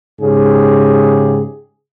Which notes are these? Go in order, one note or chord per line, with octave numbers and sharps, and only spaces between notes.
G#2 C#3 G4 G#4